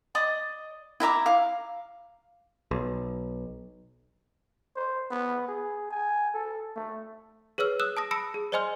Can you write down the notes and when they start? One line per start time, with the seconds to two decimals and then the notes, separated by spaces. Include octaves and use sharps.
0.15 D5 D#5 D#6
1.00 E4 E5 A#5 D6
1.26 F5 D6
2.71 B1
4.76 C5
5.11 B3
5.48 G#4
5.90 G#5
6.34 A4
6.76 A3
7.58 G#4 B4 C#5 E6 F6
7.80 D#6 E6 F#6 E7
7.97 A5 D#6 A#6
8.11 A5 B5 E6 A#6 C#7 D7
8.34 G#4
8.52 C5 D5 D#5 G#5 C6 F6